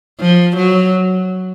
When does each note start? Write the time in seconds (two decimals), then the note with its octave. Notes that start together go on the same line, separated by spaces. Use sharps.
0.20 F3
0.56 F#3